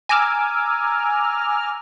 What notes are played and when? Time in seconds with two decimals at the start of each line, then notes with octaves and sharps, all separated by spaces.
0.09 G#5 A#5 D6 E6 F6